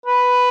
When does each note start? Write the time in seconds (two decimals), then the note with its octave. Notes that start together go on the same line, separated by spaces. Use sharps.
0.06 B4